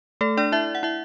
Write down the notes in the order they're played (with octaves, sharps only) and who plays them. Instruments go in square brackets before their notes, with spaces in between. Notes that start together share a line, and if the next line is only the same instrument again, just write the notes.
[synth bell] A3 A4
D4 D5
E4 E5
F#5
E4 E5